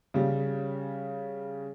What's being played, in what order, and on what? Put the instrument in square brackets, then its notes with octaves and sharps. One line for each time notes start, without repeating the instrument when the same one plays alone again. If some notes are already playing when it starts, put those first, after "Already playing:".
[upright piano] C#3 G3